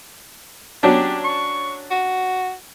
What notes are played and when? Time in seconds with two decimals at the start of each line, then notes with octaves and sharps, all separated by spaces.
0.83 F#3 C#4 D4 G4
1.25 C#6
1.91 F#4